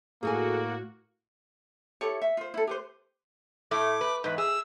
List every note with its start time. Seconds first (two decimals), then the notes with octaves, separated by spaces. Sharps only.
0.23 A2 A#3 F#4 G#4 A4 G#5
2.01 E4 G4 A4 C#5
2.21 E5
2.37 F4 C5
2.54 E4 A4
2.67 G4 B4 C5
3.71 A2 A3 D6
4.01 B4
4.24 E2 G#2 B4
4.38 G#4 E6